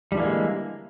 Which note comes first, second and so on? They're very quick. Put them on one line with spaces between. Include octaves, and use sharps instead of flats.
G3 D3 E3 A#3 G#3